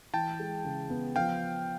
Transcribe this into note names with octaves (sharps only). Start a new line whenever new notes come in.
E3 G5 A5
G#3
C#3
B3
F3 F5 G5